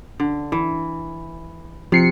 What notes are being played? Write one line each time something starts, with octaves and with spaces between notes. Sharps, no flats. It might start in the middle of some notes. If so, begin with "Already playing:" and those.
D3
E3
C3 F3 C7 C#7